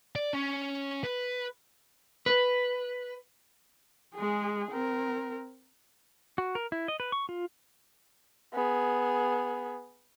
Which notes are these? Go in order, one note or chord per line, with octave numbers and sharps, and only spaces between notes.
D5
C#4
B4
B4
G#3 G#4
C4 A#4
F#4
A#4
E4
D#5
B4
C#6
F4
B3 G#4